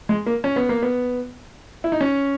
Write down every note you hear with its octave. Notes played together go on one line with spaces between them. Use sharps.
G#3
A#3
C#4
B3
A#3
B3
E4
D#4
C#4